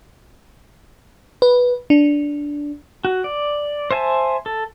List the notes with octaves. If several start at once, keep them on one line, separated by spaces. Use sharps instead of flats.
B4
D4
F#4
D5
C5 E5 G#5 A5
A4